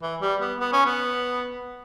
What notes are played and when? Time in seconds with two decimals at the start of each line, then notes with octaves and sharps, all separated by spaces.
0.02 E3
0.21 G3
0.41 B3
0.60 B3
0.73 C#4
0.86 B3